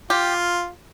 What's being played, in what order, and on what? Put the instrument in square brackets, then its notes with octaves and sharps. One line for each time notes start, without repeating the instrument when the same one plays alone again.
[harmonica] F4 [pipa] G4